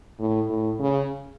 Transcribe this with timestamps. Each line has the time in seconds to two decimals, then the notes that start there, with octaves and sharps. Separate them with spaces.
0.19 A2
0.49 A2
0.80 C#3